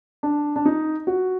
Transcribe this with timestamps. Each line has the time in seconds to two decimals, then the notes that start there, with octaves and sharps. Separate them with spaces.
0.23 D4
0.56 D4
0.65 D#4
1.07 F#4